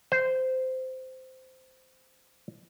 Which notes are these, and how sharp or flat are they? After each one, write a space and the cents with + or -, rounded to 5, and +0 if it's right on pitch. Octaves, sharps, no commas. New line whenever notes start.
C5 -15